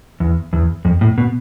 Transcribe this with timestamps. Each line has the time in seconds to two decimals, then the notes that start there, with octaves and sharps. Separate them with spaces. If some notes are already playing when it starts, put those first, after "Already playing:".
0.20 E2
0.53 E2
0.85 F2
1.01 A2
1.18 B2